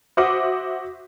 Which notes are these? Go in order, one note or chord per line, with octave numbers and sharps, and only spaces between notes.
F#4 C5 E5 F#5 D6 D#6